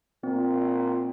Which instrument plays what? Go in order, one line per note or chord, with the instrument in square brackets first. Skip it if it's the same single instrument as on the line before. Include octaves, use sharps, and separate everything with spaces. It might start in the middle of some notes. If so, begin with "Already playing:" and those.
[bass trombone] A#2 [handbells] C4